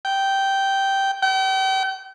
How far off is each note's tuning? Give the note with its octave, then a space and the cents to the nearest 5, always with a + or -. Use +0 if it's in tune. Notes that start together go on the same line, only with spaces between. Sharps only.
G5 -10
G5 -40